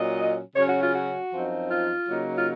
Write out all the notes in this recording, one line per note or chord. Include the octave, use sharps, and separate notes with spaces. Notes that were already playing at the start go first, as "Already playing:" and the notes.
Already playing: A#2 F#3 C#4 D#5
C#3 F#3 C#4 C#5
F#4
F4
F#4
F#2 F3 C4 D#4
F4
C#3 F#3 A#3 D#4
F4